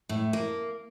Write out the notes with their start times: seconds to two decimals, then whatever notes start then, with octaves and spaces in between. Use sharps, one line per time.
0.09 A2
0.33 A#3